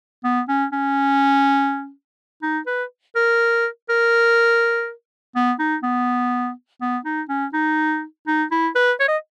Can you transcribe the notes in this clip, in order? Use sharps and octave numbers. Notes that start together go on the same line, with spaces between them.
B3
C#4
C#4
D#4
B4
A#4
A#4
B3
D#4
B3
B3
D#4
C#4
D#4
D#4
E4
B4
C#5
D#5